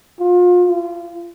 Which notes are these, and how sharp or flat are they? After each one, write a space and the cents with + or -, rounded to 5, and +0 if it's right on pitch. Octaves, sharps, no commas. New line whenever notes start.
F4 +35
F4 -30